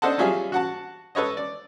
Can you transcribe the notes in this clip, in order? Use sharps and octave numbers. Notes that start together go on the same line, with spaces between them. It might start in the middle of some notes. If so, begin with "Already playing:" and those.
D4 A4 C5 D#5 F#5 A5
F#3 G3 C#4 F4 G#4 E5
F#4 F#5 A5
A4 B4 C#5 D#5
D5